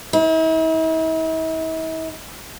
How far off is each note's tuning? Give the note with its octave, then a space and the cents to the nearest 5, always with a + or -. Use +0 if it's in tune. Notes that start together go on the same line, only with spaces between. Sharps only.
E4 -45